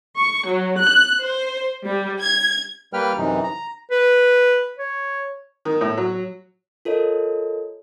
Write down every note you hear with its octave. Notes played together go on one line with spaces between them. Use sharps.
C#6
F#3
F#6
C5
G3
G#6
G3 A#3 B4 G5 F6
F#2 C3 E3 D#4
A#5
B4
C#5
D#3
A2
F#3
F4 A4 A#4 C#5 D#5